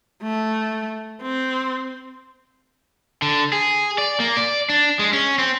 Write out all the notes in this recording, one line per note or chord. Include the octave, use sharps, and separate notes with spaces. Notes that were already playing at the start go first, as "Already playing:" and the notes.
A3
C4
D3
G#4
D5
A#3
D5
D4
G#3
C#4
C4